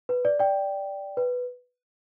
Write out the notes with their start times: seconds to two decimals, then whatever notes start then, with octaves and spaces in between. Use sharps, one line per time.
0.09 B4
0.25 D5
0.40 D5 G5
1.17 B4